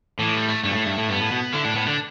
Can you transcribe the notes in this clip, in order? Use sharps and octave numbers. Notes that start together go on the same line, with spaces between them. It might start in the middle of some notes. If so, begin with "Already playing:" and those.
A2 E3
G3
A3
G2 A3
B2
A2
G2
A2
G2 B3
A2
B2
D3 E4
A2 D4
A2 B3
D3 D4